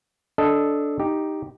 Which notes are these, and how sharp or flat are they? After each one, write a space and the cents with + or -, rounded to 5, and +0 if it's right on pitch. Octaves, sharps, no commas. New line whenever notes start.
D4 -10 A4 -5 D#5 +0
D#4 +0 G4 +0